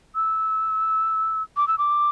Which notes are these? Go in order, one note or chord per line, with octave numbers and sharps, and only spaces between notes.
E6
D6
E6
D6